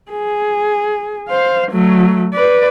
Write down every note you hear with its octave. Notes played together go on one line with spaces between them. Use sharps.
G#4
C5 F5
F#3 A3
B4 D5